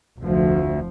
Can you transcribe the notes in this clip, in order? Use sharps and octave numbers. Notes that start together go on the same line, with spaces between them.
F1 D2 F3